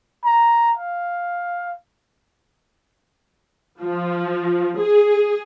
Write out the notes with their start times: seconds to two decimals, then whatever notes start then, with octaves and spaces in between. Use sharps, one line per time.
0.25 A#5
0.78 F5
3.81 F3
4.78 G#4